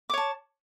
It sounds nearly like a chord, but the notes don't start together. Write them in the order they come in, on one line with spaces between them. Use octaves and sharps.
D6 C#5 A5